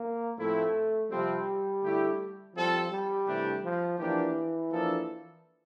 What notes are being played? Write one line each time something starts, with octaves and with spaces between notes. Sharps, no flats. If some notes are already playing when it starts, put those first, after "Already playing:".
Already playing: A#3
A2 F3 A3 C4 E4
C3 F3 G3 C4
D3 A3 E4 G4
F3 G3 C4 F4 A4
G3
C3 E3 A3 D4 G4
F3
E3 F3 A#3 D4 G4
F3 A#3 D4 A4